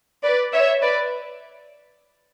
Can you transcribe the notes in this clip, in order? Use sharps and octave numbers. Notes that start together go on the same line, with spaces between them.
B4 D5
C#5 E5
B4 D5